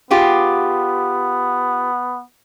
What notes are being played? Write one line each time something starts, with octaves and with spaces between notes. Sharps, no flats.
B3 F4 G4 G#4